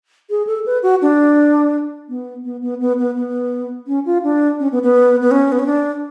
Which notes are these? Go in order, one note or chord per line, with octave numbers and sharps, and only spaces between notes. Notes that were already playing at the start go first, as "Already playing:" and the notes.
G#4
A4
B4
F#4
D4
B3
B3
B3
B3
B3
B3
C#4
F4
D4
C#4
B3
B3
B3
C#4
B3
C#4
D4